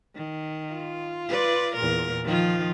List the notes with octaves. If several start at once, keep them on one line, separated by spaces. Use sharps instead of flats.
D#3
F4
B4 D5
E2 A#2 A#4
D#3 F3 F4